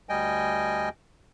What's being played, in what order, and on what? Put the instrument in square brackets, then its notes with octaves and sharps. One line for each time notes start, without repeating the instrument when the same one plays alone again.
[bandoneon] D2 G3 D#5 G5 G#5